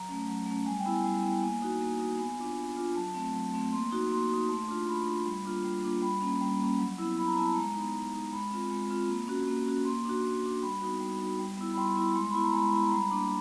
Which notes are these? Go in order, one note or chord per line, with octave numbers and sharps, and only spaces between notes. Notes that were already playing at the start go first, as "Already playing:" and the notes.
Already playing: F#3 A#5
A3 C#4
F#3
A3 C#4
G3 G#5
G5
B3 E4
G#5
G3
B3 E4
A#3 G#5
D#4 F#4
A#3
D#4 F#4
B3 G#5
D4 F4
B3
D4 F4
F#3 A5
A3 C4
F#3
A3 C4
A#3 C6
D#4 F#4
A#3 C6
D#4 F#4
A3
D4 F4
A3 B5
D4 F4
G3
A#3 D4 F4
G3
A#3 D4 F4
G3 B5
A#3 C#4
G3
A#3 C#4
F#3
B3 E4
F#3 B5
A#5
B3 E4 A5
A#5
G#3
B3 D#4
G#3
B3 D#4
G#3 B5
C4 F4
G#3
C4 F4
A#3
C#4 F#4
A#3
C#4 F#4
A#3 C6
D4 F#4
A#3
D4 F#4
G3 B5
B3 D#4 F#4
G3
B3 D#4 F#4
G3
B3 E4
B5
G3 C6
B3 E4
G#3 C6
B3 E4 B5
A#5
G#3 B5
B3 E4
A#5
G3 B5
A#3 D4